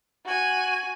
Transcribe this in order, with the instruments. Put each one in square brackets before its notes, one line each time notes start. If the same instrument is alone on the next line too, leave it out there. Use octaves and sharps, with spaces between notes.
[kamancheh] F#4 G#5